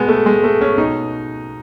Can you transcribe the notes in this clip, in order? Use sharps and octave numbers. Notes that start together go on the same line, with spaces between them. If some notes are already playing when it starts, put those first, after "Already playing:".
Already playing: B2 G#3 B3
A3
G#3
A3
C#4
B2 D#4